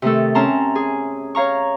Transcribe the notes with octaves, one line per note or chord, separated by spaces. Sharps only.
C3 D#3 A3 A4
C4 C#4 A5 A#5 C6
G#4
C#5 F5 A#5 C#6